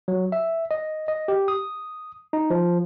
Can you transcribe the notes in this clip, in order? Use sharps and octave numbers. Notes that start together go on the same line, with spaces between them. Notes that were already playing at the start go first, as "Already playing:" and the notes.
F#3
E5
D#5
D#5
G4
D#6
D#4
F3